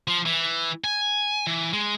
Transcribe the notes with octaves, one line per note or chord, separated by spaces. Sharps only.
F3
E3
G#5
E3
G#3